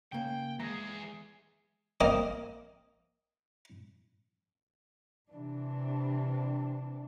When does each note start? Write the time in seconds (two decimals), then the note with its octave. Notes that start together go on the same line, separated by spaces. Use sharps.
0.12 C#3 A#3 G5
0.59 E3 G#3 G#4 A#5
2.01 A#3 C4 D#5
5.30 C3 E3 D4